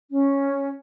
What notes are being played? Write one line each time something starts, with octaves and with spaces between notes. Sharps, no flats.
C#4